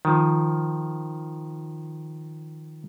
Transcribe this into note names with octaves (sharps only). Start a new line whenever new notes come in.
D#3 F3